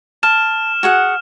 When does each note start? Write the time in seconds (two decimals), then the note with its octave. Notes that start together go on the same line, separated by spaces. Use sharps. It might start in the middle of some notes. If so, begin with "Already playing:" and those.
0.23 A5 F6 E7
0.83 F#4 G#4 F#5